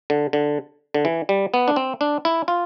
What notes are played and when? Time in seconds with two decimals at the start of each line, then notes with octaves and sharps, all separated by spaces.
0.10 D3
0.33 D3
0.94 D3
1.05 E3
1.29 G3
1.54 B3
1.68 D4
1.76 C4
2.01 D4
2.25 E4
2.48 F4